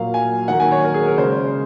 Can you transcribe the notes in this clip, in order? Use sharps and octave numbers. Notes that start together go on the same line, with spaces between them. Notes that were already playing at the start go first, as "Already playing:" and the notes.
Already playing: A#2 F#3 A#3 F5
G#5
D#3 F#3 A#3 F#5
G#5
C#5
A#4
G#4
A#4
C#3 G#3 C5